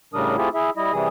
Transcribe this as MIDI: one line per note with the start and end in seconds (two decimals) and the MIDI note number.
0.14 0.36 45
0.14 0.36 49
0.14 0.36 55
0.14 0.36 62
0.14 0.36 70
0.14 0.36 87
0.37 0.49 57
0.37 0.49 60
0.37 0.49 64
0.37 0.49 65
0.37 0.49 67
0.37 0.49 68
0.54 0.70 64
0.54 0.70 68
0.54 0.70 76
0.77 0.93 55
0.77 0.93 64
0.77 0.93 75
0.93 1.08 48
0.93 1.08 52
0.93 1.08 55
0.93 1.08 68
0.93 1.08 87